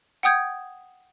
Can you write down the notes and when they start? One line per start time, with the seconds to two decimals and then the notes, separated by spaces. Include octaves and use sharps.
0.23 F#5 G5 D#6 G6 G#6